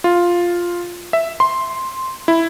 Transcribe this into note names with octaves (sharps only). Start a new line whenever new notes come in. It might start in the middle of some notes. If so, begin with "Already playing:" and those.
F4
E5
C6
E4